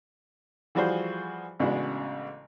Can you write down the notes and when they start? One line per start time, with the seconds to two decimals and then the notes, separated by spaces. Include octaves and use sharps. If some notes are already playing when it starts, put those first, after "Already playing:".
0.75 E3 F3 G3 F#4 G#4 C5
1.60 A1 C#3 G#3 B3 D4 F#4